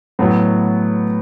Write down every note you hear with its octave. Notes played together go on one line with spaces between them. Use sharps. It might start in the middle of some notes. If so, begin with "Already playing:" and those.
A2 F#3 B3